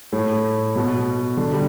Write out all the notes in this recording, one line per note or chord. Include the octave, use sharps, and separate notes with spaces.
A2
B2
D3
G3